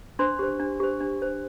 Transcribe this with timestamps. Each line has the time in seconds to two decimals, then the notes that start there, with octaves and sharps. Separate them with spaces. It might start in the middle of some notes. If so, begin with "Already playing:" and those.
0.19 D4 C5 C6
0.39 G4 C5
0.60 D4
0.80 G4 C5
1.00 D4
1.22 C5